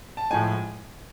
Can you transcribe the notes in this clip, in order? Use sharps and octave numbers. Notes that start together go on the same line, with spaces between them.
A5
A2 F3 G#3 G#5